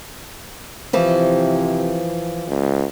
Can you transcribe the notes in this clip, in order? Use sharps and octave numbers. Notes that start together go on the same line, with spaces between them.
C3 E3 F3
C#2